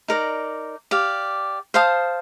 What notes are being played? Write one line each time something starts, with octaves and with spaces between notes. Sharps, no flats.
D#4 A#4 D5
G4 D5 F5
C5 F5 A5 D#6